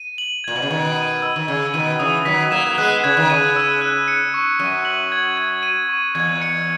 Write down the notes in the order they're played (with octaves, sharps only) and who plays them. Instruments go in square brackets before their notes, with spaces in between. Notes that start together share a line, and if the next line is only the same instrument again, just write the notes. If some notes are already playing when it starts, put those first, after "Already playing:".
Already playing: [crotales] D#7
F#7
[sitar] A#2 [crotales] G#6
[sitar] B2
C#3
[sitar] B2 D#3 [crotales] G#6
[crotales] D#7
E6
[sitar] D#3
[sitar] C#3 [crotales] G#6
[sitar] B2 D#3 [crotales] D#7
[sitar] C#3 E3 [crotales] D#6
[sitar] D#3 F#3 [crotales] B6
[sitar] F#3 A#3 [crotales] E7
[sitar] A#3
[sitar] G#3 B3 [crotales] F#6
[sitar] C#3 [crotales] G#6
[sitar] D#3
[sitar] C#3 [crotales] D#7
[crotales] E6
F#6
C#7
C#6
[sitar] F#2 [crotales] D#7
[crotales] F#7
G#6
G#6
D#7
C#6
[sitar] E2 [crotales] G#6
[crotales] C#7